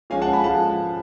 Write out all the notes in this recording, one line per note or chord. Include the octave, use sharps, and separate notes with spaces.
F3 G#3 C#4 F5 G#5
F#5 A5
G#5 B5
F3 G#3 F#5 A5